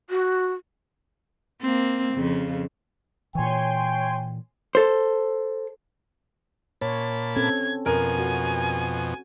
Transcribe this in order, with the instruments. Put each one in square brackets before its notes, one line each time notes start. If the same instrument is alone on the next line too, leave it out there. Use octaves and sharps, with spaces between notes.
[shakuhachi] F#4
[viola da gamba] A#3 C4
F2 C#3
[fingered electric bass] A#2 E3 [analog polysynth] C#5 G#5 C6 [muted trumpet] G5
[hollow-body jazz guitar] A4 C5
[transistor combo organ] A#2 A5 B5 [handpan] C#5
[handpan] C4 C#4 A4 [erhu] G#6
[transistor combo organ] F2 B2 [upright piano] A#4 [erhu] G#5
[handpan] F#4